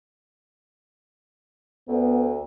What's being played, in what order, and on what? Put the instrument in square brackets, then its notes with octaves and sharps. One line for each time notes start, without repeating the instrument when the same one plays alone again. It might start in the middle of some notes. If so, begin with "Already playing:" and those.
[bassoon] D2 [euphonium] B3